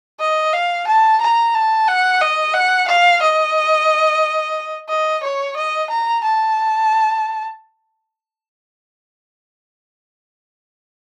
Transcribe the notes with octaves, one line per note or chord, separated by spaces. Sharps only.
D#5
F5
A5
A#5
A5
F#5
D#5
F#5
F5
D#5
D#5
C#5
D#5
A#5
A5